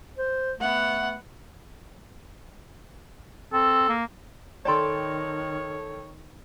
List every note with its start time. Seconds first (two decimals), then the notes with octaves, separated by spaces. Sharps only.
0.18 C5
0.60 A3 B3 F#5
3.53 C4 A4
3.89 A#3
4.65 D#3 A4 C#5 D5 G5 A5 C6